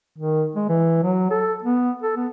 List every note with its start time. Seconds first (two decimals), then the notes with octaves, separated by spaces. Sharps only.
0.18 D#3
0.56 G#3
0.69 E3
1.03 F#3
1.31 A4
1.62 B3
2.02 A4
2.16 B3